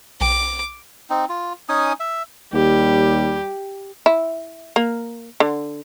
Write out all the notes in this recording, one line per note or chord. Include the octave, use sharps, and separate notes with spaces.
B1 G5 D6
C4 D#4
F4
C#4 D#4 G#5 D#6
E5
D#2 G3 G4
E4
A#3
D3